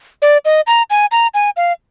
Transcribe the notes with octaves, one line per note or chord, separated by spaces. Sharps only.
D5
D#5
A#5
G#5
A#5
G#5
F5